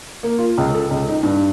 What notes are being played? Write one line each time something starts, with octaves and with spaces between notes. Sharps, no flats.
A#3
F4
C#2
A4
C#2
D#4
G2